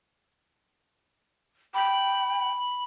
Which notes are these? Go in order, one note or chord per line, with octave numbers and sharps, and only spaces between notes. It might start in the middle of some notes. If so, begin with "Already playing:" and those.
G5 B5